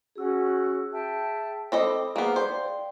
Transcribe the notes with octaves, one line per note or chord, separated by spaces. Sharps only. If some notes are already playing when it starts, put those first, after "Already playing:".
C#4 F#4 G#4 E6
E5 G5 A5
C4 A4 D#5 B5 D6
A#3 B3 G#4 C5 F5
C5 D5 G5